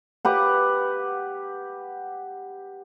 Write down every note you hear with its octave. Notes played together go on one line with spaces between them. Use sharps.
G4 B4 F#5